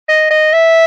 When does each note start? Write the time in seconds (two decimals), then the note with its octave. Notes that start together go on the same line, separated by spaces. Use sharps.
0.08 D#5
0.30 D#5
0.53 E5